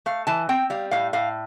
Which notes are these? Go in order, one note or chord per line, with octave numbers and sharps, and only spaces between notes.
A3 F5
E3 A5
C4 G5
G3 F5
A2 F5
A2 F5